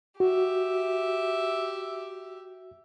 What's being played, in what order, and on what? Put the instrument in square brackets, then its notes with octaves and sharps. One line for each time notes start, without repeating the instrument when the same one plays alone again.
[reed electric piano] F#4 [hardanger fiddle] G4 E5